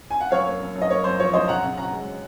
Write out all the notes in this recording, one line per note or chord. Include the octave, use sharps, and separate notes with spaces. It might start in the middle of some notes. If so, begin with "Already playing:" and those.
G#5
F#5
F#2 C#5 F5
A#3
F#2
F#2
D#5
A#3 C#5
F#2 C5
F3 C#5
F#2 C5 D#5
C#3 F#5 A#5
C#3
C#3 F#5 A#5
G#3